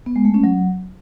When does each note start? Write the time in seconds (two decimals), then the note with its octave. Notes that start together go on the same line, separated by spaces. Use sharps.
0.06 B3
0.16 G#3
0.25 A3
0.34 C#4
0.44 F#3